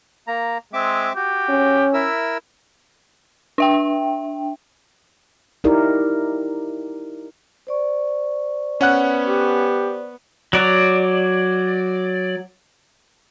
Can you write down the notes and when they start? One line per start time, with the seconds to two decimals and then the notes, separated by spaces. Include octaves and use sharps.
0.27 A#3 A#5
0.73 G#3 C4 E5 D6
1.16 F#4 G4
1.50 C#4
1.93 E4 A#4 E5 E6
3.58 D4 E5 G5
5.64 D#4 E4 G4 A#4 D5
7.67 C5 D5 C#6
8.81 B3 C#4 F#5 F#6
9.25 G4
10.53 F#3 D5